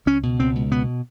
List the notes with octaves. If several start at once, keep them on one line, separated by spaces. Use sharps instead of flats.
C#2 C#4
B2
C#2 C4
C#2
B2 B3